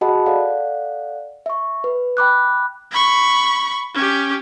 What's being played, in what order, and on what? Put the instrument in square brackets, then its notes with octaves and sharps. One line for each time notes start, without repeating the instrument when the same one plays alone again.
[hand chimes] F#4 G#4 D#5 F#5 A5 B5
A4 D5 F5 F#5
E5 C#6
B4
G5 B5 D6 F#6
[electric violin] B5 C#6
C#4 G4